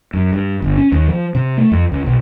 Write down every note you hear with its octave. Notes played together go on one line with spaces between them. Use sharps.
F#2
G2
G1
C#4
D#2
F3
C3
A3
F2
C#2
B1